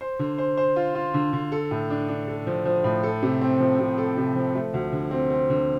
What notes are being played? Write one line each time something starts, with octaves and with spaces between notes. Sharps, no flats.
C5
D3
C5
C5
F4
F4
D3
D3
A4
A2
D4
D4
A4
F3
F3
A2
A4
C3
C4
F3
C3
A4
C3
F3
A3
D2
D3
C4
C4
D3